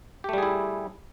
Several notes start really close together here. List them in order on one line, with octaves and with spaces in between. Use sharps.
G4 A3 G3 G#4 E4